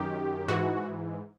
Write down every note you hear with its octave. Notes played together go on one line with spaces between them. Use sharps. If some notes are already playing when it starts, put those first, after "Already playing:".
Already playing: F#2 D#3 G4
G#2 E3 F#4